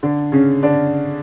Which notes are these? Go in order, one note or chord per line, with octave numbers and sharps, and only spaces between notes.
D3 D4
C#3 C#4
D3 D4